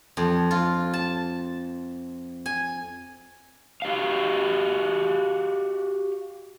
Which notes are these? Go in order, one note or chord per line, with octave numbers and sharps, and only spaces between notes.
F2
F4
A5
G#5
F#4 G4 D#5 F5